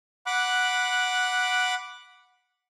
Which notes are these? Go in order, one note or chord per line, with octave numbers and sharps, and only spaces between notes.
F#5 B5 D6 F#6